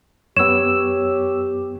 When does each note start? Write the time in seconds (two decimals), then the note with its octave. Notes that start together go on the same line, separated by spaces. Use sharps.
0.37 F#2 B3 G4 C#5 E6 E7